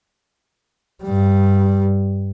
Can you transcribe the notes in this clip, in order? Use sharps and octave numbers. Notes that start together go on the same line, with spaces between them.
G2 G3